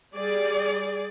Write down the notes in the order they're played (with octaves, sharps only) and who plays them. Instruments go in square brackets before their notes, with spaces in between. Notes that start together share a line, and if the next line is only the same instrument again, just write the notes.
[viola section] G3 G#4 D5